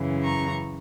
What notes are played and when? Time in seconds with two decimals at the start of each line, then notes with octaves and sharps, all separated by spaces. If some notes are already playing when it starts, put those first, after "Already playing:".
Already playing: F#2 C#3 E3
0.23 A#5 C#6